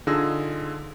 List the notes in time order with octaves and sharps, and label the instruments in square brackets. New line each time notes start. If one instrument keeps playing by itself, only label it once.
[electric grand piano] D3 D#4 F4 G#4 E6 A#6